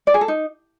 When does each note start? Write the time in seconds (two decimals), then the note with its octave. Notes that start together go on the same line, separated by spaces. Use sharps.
0.07 D5
0.14 G#4
0.21 A4
0.28 D#4